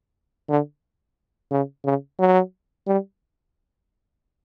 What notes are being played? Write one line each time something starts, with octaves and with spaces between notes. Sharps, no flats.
D3
C#3
C#3
F#3
G3